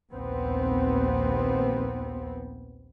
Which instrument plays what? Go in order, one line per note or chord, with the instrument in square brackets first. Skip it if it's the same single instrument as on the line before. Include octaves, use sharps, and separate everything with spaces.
[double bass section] A#1 D#2 B3 C4